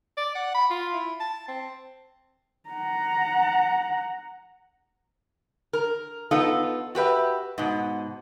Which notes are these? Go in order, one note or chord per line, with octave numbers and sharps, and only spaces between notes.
D5
F#5
B5
F4
E4
A5
C4
F#5 A#5
A#4
B3 D#4 F4 A4
F#4 G4 B4 E5
G#2 B2